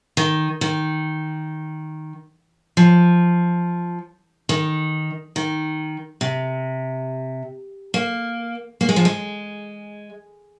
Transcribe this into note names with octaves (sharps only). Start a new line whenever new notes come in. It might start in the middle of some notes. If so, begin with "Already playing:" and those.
D#3
D#3
F3
D#3
D#3
C3
A#3
A#3
G#3
F3
G#3